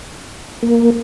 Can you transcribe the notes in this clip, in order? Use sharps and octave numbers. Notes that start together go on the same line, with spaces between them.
A#3